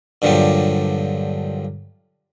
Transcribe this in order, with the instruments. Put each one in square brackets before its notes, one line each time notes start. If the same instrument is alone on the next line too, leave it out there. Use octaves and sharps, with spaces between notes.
[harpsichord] G2 A#2 D3 F3 F#3 G4